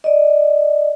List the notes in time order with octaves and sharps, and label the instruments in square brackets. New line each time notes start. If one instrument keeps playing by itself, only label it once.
[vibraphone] D5 D#5